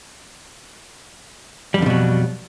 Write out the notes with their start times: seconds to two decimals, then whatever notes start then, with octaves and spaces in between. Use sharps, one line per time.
1.74 G3
1.78 F2
1.82 D3
1.86 B2
1.90 F#3